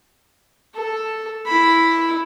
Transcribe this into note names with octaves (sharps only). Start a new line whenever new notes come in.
A4
E4 B5